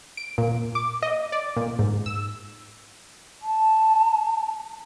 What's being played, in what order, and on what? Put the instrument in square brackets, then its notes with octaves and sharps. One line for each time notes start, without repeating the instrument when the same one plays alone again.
[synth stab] D7
A#2
D6
D#5
D5
A#2
G#2
E6
[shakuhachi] A5